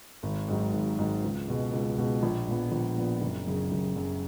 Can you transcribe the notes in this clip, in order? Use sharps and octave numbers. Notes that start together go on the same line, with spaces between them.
G#1
G#2 D#3 F#3
G#1
G#2 D#3 F#3
C#2
B2 G#3
C#2
B2 G#3
A#1
A#2 F3 B3
A#1
A#2 F3 B3
F#1
F#2 C#3
F#1
F#2 C#3